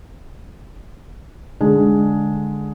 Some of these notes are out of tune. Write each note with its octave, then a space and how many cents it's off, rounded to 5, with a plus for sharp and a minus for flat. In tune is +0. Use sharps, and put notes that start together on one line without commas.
D3 -5 G#3 +0